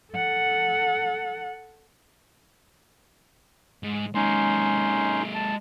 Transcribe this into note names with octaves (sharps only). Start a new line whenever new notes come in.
A4 F#5
G#2
G#3 A#3 C#4 D#4 C6
A5